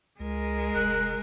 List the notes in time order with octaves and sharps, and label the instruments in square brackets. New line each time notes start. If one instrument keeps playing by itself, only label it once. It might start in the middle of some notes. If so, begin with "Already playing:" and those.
[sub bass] C#2 [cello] G#3 A#4
[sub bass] F1 [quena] F#6